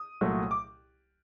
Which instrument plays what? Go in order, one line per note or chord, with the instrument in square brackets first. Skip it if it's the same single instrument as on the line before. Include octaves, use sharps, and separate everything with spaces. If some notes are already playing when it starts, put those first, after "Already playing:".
Already playing: [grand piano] D#6
C2 A#2 F#3 A3
D6